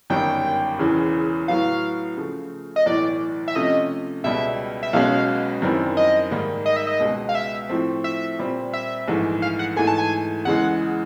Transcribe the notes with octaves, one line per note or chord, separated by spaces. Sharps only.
G1 F#2 D#3 G3 G5
E1 E2 C#3 E3
A2 F#3 B3 F5
C#3 F3 A3
D#5
B1 A2 E3 D5
E5
C3 F3 A3 C#4 F4 D#5
C#2 B2 G3 E5
E5
B1 B2 G#3 C#4 F#4 F5
F#2 D#3 G3 C4 E4
D#5
G#2 D#3 G3 A#3
D#5
E5
D#5
C#2 B2 G#3
F5
E5
A2 F3 A3 C4
E5
A#2 G3 C4
E5
A#1 G#2 E3 A3
F5
F#5
G#2 E3 A3 G#5
A5
G#5
E2 C#3 E3 G#3 F#5